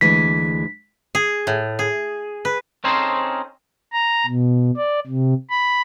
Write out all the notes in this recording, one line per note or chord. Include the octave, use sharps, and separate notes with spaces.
D2 E3 G#3 B6
G#4
A2
G#4
B4
C4 C#4 D#4 G#4 A4 C5
A#5
B2
D5
C3
B5